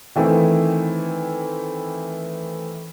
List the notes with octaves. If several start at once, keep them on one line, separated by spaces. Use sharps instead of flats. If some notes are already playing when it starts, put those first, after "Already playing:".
D#3 E3 A3 C4 E4